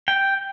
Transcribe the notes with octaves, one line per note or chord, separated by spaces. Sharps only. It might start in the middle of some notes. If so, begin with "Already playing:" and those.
G5